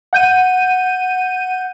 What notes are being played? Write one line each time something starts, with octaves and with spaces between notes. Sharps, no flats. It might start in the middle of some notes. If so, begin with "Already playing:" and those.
F#5 G6 D#7